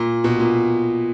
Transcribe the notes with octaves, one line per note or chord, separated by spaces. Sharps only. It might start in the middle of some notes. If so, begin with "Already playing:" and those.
Already playing: A#2
B2
A#2